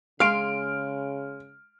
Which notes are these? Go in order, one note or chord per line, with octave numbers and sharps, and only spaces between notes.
C#3 G#3 F5 C6 F6 D7